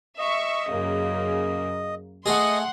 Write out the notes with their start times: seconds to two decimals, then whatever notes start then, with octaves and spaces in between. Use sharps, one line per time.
0.18 D#5 E5 C#6
0.68 F#2 C#3 A#3
2.26 A3 G#4 D#5 F#5 C6